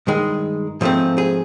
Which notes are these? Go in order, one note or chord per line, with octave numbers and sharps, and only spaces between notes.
G2 D#3 G#3
G#2 F3 A3 C4
G#4